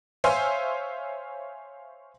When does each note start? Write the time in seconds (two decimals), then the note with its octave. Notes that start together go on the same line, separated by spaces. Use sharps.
0.24 C5 C#5 E5 F5 G#5 C6